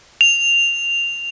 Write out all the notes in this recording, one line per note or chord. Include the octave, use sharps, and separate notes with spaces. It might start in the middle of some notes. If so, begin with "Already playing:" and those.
F7